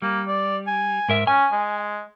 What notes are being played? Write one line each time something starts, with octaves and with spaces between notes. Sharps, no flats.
G3 A#3
D5
G#5
G#2 A#4 E5
C#4 G#5
G#3